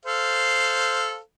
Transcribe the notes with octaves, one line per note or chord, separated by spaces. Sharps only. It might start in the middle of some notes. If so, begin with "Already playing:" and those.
A4 C5 F5